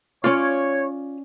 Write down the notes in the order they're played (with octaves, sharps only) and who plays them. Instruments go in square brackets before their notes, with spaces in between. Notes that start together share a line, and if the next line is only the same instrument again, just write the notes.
[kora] C#4 D5 [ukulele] F4 [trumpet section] C#5